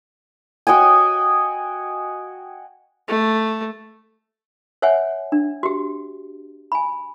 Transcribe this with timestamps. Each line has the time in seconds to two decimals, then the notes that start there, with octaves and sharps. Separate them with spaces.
0.67 F#4 D#5 G5 G#5
3.08 A3
4.82 C5 C#5 E5 F#5 G#5
5.32 D4
5.63 F#4 G4
6.72 G#5 B5